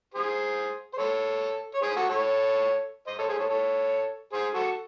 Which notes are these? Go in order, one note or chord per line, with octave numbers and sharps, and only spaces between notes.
G#4 C5
C5
A4 C#5
C#5
G#4 C5
F#4 A4
A4 C#5
C5 D#5
A4 C#5
G#4 C5
A4 C#5
A4 C#5
G#4 C5
F#4 A4